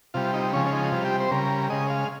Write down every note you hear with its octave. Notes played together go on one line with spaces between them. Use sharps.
C3 G3 F4
D#4
C#3 F3 G#3 C#4
C#4
D#4
C3 G3 F4
G4
C5
C#3 G3 A#4
C#3 G#3 D#5
F5